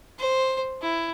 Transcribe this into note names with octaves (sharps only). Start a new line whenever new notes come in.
C5
E4